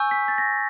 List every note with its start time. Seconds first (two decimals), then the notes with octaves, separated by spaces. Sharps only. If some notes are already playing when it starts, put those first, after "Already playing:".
Already playing: G#5 C#6 E6 G6
0.11 B6
0.28 A6
0.38 A#6